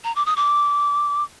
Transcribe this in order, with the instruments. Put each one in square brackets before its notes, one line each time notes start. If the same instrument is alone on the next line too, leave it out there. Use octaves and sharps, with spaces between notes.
[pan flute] A#5
D6
D#6
D6